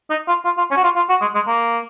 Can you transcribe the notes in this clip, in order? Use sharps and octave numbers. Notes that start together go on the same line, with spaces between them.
D#4
F4
F4
F4
C#4
F#4
F4
F4
F#4
G#3
G#3
A#3